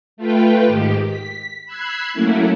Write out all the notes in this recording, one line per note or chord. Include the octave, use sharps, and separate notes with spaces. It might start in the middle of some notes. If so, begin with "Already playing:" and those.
A3 F4 B4 G5
G#2 D#3 G4
B6
B5 E6 F#6 G#6 C7
F#3 A3 A#3 C#4 E4